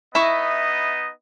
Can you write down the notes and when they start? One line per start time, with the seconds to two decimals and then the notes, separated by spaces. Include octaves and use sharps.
0.15 B3 D#4 E4 D#5 E5 C#6